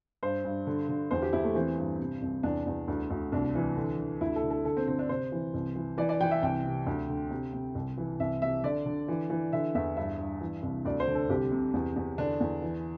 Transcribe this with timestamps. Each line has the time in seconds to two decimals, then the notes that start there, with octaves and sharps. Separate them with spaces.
0.23 G2 C5
0.45 G2
0.67 D3
0.89 D3
1.11 E2 C5
1.22 G4
1.33 E2 E4
1.44 A3
1.55 E3 C4
1.78 G2
1.99 C3
2.22 C2
2.43 E2 D4
2.66 E2
2.88 D2
3.10 D2
3.32 C2 D4
3.55 E3
3.77 D3
3.99 D3
4.21 D2 E4
4.36 A4
4.43 D3
4.50 A4
4.65 D3 A4
4.77 C4
4.88 D3 C4
4.99 D4
5.09 C3 C5
5.32 E3
5.54 C2
5.76 E3
5.98 E3 D5
6.09 D5
6.20 E3 G5
6.31 E5
6.43 C2 G5
6.64 C3
6.86 D2
7.09 D3
7.31 C3
7.53 C3
7.75 C2
7.98 E3
8.20 C2 E5
8.42 C3 E5
8.63 D3 D5
8.86 D3
9.08 E3
9.30 E3
9.53 D3 E5
9.75 E2 E5
9.96 G2 E5
10.19 G2
10.41 E3
10.63 C2
10.85 D2 D5
11.00 C5
11.08 D3
11.15 A4
11.29 C2 G4
11.52 C3
11.74 E2
11.96 E2
12.18 D3 D4
12.41 E2
12.62 E3